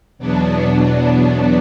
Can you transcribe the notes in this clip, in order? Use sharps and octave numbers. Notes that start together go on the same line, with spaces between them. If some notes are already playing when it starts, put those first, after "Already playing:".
E2 B2 F#3 B3 D4